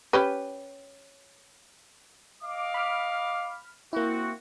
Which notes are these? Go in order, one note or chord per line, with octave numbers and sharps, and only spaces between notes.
C#4 G4 B4
D#5 F5 D6
B5 F6
A#3 C4 E4 F#4